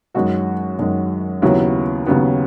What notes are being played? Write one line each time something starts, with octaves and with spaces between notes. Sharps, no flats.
F#2 D#3 G#3 F#4
F#2 D#3 G#3
D#2 C#3 F#3 B3 E4
D#2 C#3 F#3 B3